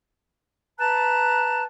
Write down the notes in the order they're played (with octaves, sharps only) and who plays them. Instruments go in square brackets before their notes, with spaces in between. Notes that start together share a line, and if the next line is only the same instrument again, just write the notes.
[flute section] B4 A5 A#5 F#6